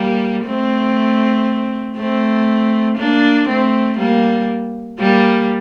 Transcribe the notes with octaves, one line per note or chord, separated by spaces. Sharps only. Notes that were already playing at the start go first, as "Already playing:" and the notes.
Already playing: G3 A#3
A3 C4
A3 C4
A#3 D4
A3 C4
G3 A#3
G3 A#3